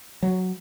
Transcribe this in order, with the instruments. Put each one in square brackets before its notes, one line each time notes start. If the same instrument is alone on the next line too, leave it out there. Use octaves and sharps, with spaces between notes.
[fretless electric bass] F#3